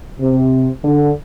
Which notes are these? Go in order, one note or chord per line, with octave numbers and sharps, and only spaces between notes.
C3
D3